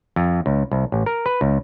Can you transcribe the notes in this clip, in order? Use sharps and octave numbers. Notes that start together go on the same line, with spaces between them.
F2
C#2
C2
A1
A#4
B4
C#2